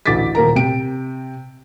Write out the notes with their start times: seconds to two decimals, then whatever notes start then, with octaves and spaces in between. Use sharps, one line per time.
0.06 A1 D2 D6 A6 B6
0.35 D#1 A#3 A#4 A#5
0.56 C3 G5 D7